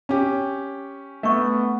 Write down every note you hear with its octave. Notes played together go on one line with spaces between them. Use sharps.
C#4 G4
A3 B3 D4 C#6